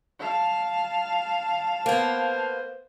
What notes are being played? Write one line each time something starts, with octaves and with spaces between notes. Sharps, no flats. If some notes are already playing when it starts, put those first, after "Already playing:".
F5 A5
A#3 B3 C5